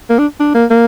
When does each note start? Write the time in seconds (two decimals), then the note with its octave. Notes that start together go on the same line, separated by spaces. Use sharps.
0.10 A#3
0.19 D4
0.40 D4
0.54 A#3
0.70 A#3